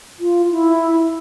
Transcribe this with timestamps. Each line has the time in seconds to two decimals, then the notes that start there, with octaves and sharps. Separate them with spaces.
0.20 F4
0.52 E4